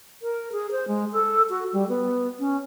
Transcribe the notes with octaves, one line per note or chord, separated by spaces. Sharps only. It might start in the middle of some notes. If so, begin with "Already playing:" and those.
A#4
G#4
C5
G#3
A4
F#4
G3
B3
C#4